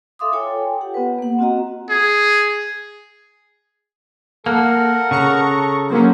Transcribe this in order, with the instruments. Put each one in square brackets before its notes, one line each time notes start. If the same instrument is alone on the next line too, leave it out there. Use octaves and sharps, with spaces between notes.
[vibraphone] A4 E5 F5 C6 D6 D#6
F4 A4 C#5 G5 G#5
G4 F#5
B3 B4
A#3 F#5
C4 F4 F#4 D#5 A#5
[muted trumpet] G#4
[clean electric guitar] A#3 [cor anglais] A4 [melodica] A#4 F#5
[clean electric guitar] C#3 [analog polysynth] A#5 C#6
[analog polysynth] F#3 A#3 C#4 [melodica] C5